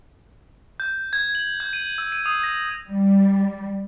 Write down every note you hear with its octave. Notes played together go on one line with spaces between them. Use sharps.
G6
G#6
F#7
G6
D#7
E6
D#7
D#6
A#6
G3